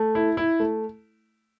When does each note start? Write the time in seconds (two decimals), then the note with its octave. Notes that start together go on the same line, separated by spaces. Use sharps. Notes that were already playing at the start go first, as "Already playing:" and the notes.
Already playing: A3
0.15 E4
0.37 E4
0.60 A3